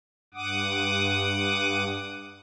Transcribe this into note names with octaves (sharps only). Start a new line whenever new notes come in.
G2 F#5 D6 D#6